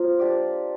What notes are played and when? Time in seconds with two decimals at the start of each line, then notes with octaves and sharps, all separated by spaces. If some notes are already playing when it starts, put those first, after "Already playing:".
Already playing: F3 A#3 F4
0.19 D4 G4 D5